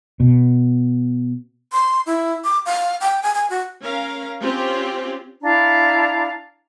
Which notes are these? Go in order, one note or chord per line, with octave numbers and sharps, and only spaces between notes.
B2
C6
E4
D6
F5
G5
G#5
G#5
F#4
C#4 A#4 F5
C4 C#4 F4 G4
D4 E4 F5 A#5